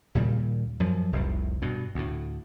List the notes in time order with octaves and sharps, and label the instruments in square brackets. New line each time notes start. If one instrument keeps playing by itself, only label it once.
[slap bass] D#2 A#2 C#3 G3
F#2 F3
F1 C2 A2
G2 B2
D2 A2